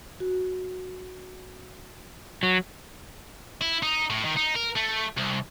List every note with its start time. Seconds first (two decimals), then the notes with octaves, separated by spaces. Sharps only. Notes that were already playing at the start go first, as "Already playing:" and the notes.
0.20 F#4
2.43 F#3
3.61 E4
3.83 D#4
4.10 A2
4.25 D#3
4.37 D#4
4.56 A#4
4.76 A3
5.17 C2